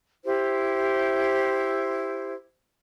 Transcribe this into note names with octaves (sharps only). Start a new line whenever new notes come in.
E4 G4 C5